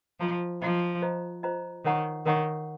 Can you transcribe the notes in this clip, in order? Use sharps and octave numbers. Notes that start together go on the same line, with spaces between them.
F3 F4 C5 D#5 A#5
F3 F4 C5 D#5 A#5
F4 C5 D#5 A#5
F4 C5 D#5 A#5
D#3 A#4 C#5 F#5 A#5 C#6
D#3 A#4 C#5 F#5 A#5 C#6